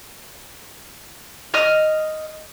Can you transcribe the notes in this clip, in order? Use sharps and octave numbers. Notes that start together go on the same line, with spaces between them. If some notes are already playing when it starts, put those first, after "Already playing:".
D#5 F6